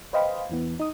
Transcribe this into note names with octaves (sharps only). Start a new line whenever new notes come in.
B4 C5 D#5 F5 G5 B5
E2 E3 B3
D#4 D#6